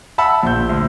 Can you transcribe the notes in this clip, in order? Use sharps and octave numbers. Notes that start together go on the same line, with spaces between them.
E5 F#5 A5 B5 E6
A#1 G6
D2